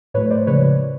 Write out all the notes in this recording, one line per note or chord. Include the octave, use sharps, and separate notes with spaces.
A2 F#3 A3 B4 C#5
C5 D5
C#3 F3 G#3 B4 C#5